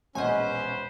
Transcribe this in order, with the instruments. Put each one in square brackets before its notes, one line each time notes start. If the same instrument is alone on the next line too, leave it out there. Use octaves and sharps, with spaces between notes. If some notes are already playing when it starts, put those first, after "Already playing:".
[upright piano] E1 A#1 F#5 [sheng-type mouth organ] C#4 [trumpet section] B4 C5 [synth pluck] D#5 G#5